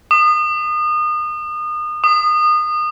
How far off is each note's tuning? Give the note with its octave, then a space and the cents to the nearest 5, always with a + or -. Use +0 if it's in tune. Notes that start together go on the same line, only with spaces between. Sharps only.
D#6 -30
D#6 -25